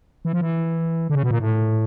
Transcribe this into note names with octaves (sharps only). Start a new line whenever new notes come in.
E3
F3
E3
D3
C#3
B2
A#2
A2